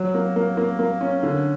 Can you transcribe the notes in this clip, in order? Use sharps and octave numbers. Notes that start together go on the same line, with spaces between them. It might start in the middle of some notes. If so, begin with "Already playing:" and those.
Already playing: F#3
A#3
A#3
A#3
A#3
C#4
D3